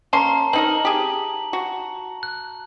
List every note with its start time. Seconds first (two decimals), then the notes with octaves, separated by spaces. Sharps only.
0.13 A#3 C#4 A5 A#5 C6
0.53 C4 D#4 A#4 F#7
0.85 G4 G#4
1.53 F#4
2.23 F#6